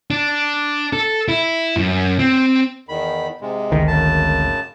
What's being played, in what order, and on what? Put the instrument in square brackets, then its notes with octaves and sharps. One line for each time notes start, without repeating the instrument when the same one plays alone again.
[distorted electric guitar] D4
A4
E4
F#2
C4
[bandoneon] E2 D#3 B5
G#2 C3 G#3
[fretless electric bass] G#1 D2 D#3
[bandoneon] F#2 C#3 A5